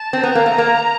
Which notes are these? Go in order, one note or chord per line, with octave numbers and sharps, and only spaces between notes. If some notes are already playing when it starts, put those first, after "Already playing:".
Already playing: A5
C4
B3 A#5
A#3
A3
A#3